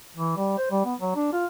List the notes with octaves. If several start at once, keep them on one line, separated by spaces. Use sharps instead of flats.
E3
G3
C5
G3
B3
F#3
D4
F4